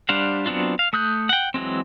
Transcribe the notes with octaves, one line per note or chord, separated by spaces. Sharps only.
G3 D4 C5 F5 F#5
F#3 B3 C4 D4 F4
F5
A3 D#6 F#6 G6
F#5 G5
E3 F#3 G#3 C4